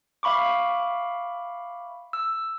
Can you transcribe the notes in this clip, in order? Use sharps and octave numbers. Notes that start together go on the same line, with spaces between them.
E5 F5 B5 C#6 D6
E6